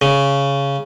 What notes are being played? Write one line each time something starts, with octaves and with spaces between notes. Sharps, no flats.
C#3